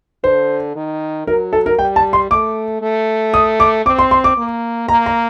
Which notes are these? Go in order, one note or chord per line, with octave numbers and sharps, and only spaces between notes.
D3 C5
D#3
F#3 A#4
A4
A#4
G3 G5
A5
C6
A3 D6
A3
D#6
D6
C4 D6
C6
C6
D6
A#3
A#3 A#5
A#5